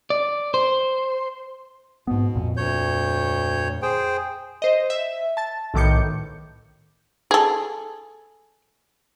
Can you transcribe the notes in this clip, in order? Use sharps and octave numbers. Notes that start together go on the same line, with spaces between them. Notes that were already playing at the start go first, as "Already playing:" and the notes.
D5
C5
G#2 B2 B3
F2 A#2
D2 C#5 G6
G#4 C5 G5
C5 D#5
E5
A5 A6
B1 A2 D#3 D6 G6 C#7
G#4 A4